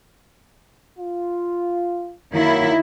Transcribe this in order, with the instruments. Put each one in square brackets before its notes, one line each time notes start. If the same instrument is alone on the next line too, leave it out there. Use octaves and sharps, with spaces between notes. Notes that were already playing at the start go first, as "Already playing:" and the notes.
[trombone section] F4
[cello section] D#3 E4 [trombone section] F#3 A#3